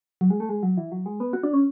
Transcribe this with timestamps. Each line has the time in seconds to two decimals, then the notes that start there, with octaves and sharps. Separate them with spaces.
0.21 F#3
0.30 G#3
0.40 A3
0.49 G#3
0.63 F#3
0.77 E3
0.92 F#3
1.06 G#3
1.20 B3
1.33 F#4
1.43 D4
1.53 C#4